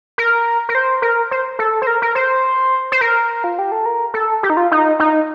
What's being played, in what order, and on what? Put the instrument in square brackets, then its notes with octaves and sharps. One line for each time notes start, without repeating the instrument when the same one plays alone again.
[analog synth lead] A#4
A#4
C5
A#4
C5
A4
C5
A#4
A#4
C5
C5
A#4
F4
G4
A4
A#4
A4
G4
D#4
F4
D#4
D#4